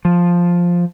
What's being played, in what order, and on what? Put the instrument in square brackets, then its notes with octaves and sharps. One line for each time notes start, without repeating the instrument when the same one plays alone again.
[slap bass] F3